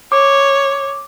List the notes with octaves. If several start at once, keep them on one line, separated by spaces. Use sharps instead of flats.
C#5 D6